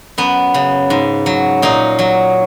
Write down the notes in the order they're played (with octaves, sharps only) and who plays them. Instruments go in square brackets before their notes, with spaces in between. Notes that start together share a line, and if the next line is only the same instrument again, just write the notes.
[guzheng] F#2 B3
C#3
G#2
F#3
A#2 D#4
F#3